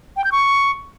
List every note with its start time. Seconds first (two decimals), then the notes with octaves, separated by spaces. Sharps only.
0.17 G5
0.24 G6
0.32 C#6